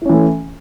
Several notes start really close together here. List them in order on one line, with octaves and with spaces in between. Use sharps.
E4 C#4 E3 A3